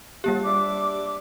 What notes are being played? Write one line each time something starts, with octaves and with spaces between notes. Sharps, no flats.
G3 A#3 G4
D4 E5 D6